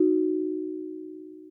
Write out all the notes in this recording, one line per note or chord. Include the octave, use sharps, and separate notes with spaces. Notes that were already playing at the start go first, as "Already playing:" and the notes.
Already playing: D#4 F#4